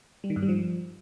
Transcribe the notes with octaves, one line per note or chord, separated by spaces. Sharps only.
G3
D#3
G2
G3
F3